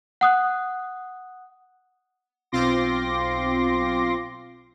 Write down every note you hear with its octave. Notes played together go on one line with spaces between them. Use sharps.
F#5 D#6 F#6
B1 C4 F4 C6 D6 A#6